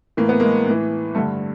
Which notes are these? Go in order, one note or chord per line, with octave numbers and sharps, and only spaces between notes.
A2 E3 A#3
B3
G#3 A#3
A2 E3
G2 D3 A3